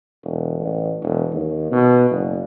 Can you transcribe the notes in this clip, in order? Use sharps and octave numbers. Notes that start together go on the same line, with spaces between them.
E1
A1
E1
D#2
B2
F#1